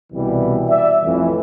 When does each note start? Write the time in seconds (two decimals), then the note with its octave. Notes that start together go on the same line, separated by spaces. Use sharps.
0.13 C2 B2 E3 G3
0.68 D5 E5
1.04 A1 F2 A2 E3